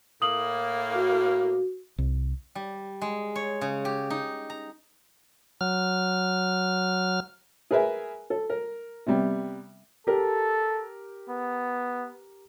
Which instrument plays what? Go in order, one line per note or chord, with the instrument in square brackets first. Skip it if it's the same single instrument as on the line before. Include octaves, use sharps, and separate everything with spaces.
[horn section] A2 A#3 [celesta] D#6 F#7
[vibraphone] F#4
[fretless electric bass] C2
[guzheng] G3
G#3
C#5
C#3
G4
D#4
A#5
[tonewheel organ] F#3 F6
[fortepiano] G#4 A#4 B4 E5 G#5
A4
A#4
C3 G3 B3
[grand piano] G4 A#4 [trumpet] A4
[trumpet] B3